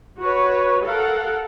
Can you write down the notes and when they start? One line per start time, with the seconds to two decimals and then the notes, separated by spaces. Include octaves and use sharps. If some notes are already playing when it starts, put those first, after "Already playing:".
0.20 F#4 B4 C#5
0.85 A4 A#4 F5 F#5